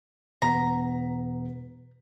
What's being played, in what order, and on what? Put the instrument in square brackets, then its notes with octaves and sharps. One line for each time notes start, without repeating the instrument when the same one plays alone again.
[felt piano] E1 B3 B6 [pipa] A#5